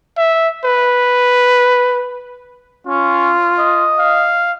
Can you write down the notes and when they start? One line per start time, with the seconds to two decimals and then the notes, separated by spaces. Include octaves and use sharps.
0.17 E5
0.64 B4
2.87 C#4 F4
3.58 D#5
3.99 F5